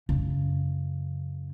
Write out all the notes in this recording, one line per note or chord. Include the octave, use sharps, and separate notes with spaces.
F#2 C#3